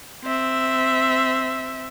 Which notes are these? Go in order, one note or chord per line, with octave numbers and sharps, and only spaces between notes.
C4 E5